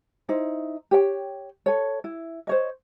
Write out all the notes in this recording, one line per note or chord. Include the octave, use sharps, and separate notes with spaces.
D#4 E4 C5
G4 C#5 G5
A4 C#5
E4
C5 C#5 D#5